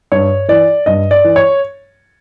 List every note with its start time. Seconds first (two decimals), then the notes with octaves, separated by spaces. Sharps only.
0.12 G2 C#5
0.48 E3 D5
0.86 G2 D#5
1.11 D5
1.24 E3
1.36 C#5